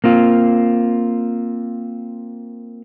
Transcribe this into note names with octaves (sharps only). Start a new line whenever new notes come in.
A#3 C4 F4